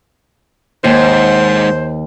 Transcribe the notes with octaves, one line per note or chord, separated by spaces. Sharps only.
D#2 G#2 C5